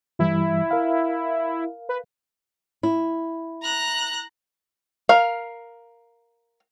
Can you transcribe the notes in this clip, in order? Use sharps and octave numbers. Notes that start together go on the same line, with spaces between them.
G2 E3 G3 E4
A#4 F5
B4
E4
A#5 F#6
A#4 F5